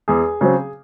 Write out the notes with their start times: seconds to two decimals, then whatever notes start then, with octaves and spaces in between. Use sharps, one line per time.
0.08 E2 G#4
0.41 C#3 F#3 C4